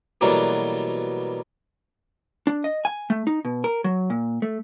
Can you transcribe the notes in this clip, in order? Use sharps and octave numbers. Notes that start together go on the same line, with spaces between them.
B2 E3 F#3 G3 A3 A#3
D4
D#5
G#5
A3
D#4
B2
A#4
F#3
A#2
A3